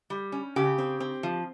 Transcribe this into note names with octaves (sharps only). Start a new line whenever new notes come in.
G3
C#4
C#3 G4
C4
C4
F3